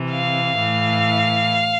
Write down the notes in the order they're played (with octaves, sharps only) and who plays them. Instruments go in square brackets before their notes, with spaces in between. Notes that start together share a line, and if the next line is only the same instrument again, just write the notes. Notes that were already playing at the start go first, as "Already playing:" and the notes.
Already playing: [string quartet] C3 E3
F5
A2 E3